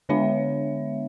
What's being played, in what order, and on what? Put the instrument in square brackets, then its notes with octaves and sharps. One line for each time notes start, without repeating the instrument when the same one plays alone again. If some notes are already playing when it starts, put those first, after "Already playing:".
[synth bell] D3 G#3 B3 D4 C#5 E5